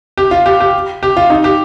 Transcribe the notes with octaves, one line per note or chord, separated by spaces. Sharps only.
G4
F4
G4
G4
G4
F4
D#4
G4